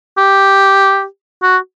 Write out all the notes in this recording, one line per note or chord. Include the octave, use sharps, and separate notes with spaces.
G4
F#4